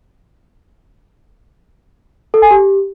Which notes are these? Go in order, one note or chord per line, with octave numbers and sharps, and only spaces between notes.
A4
G#5
G4